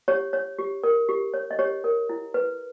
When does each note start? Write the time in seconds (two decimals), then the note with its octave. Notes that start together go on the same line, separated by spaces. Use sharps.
0.08 G4 C#5
0.33 C#5
0.59 G4
0.84 A#4
1.09 G4
1.34 C#5
1.51 D#5
1.59 G4 C#5
1.84 A#4
2.09 E4
2.34 B4